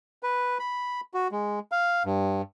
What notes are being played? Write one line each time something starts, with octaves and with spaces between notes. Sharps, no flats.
B4
B5
F#4
G#3
F5
G2